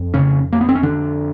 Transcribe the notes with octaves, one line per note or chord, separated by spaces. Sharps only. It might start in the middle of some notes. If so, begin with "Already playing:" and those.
Already playing: F2
C#3 C#4
A#3
B3
C4
C#4
D3 D4